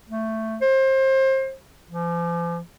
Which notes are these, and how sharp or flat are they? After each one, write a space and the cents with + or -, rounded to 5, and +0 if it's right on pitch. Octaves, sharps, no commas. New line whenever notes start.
A3 +10
C5 +30
F3 -40